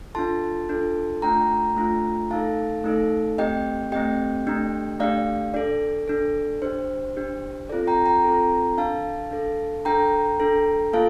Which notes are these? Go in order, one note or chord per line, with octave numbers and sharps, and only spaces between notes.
D4 F4 A4 A5 C6
D4 F4 A4
A3 D4 F4 G5 A#5
A3 D4 F4
A3 D#4 A4 F5 A5
A3 D#4 A4
A3 C4 G4 D#5 G5
A3 C4 G4 D#5 G5
A3 D4 G4
A3 D4 G4 D5 F5
D4 A4 D5
D4 A4
D4 G4 C5
D4 G4
C4 F4 A4 D5
G5 A#5
G5 A#5
C4 F4 A4
D4 A4 F5 A5
D4 A4
D4 A4 G5 A#5
D4 A4
A#3 F4 A4 F5 A5